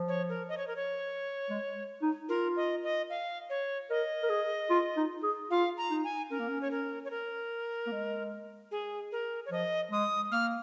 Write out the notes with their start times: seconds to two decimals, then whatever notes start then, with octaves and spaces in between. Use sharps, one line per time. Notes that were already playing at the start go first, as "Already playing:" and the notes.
Already playing: F3
0.08 C#5
0.29 A#4
0.49 D#5
0.57 C#5
0.67 A#4
0.76 C#5
1.50 G#3
2.02 D#4
2.29 F4 A#4
2.57 D#5
2.83 D#5
3.10 F5
3.50 C#5
3.90 A#4 D#5
4.23 A#4
4.30 G#4
4.70 F4
4.97 D#4
5.23 G#4
5.51 F4 F5
5.77 A#5
5.90 D#4
6.04 G#5
6.30 C#4 A#4
6.39 A#3
6.49 C#4
6.61 C#5
6.71 A#4
7.05 C#5
7.11 A#4
7.87 A#3
7.92 G#3
8.71 G#4
9.12 A#4
9.46 C#5
9.51 F3 D#5
9.92 G#3 D#6
10.32 A#3 F6